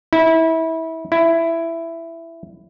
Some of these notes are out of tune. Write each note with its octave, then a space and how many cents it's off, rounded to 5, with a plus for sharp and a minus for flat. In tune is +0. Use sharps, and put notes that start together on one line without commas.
E4 -25
E4 +10